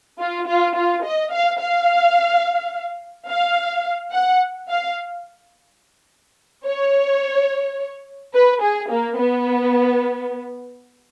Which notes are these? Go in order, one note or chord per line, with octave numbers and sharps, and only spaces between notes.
F4
F4
F4
D#5
F5
F5
F5
F#5
F5
C#5
B4
G#4
A#3
B3